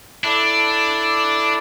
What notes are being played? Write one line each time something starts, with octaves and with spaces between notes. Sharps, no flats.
D4 E4 A4 D5